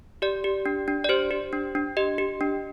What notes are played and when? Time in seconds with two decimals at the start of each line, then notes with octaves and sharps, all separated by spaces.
0.22 G4 D5
0.44 G4
0.66 D4
0.88 D4
1.04 D5
1.09 G4 C5
1.31 G4
1.53 D4
1.75 D4
1.97 G4 D#5
2.18 G4
2.41 D4